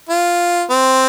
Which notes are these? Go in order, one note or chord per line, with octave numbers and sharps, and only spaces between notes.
F4
C4